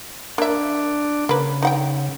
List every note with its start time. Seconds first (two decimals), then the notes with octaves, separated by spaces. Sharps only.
0.38 A#3 D4 E5
1.29 C#3 A#3 B4
1.62 D#4 F#5 G5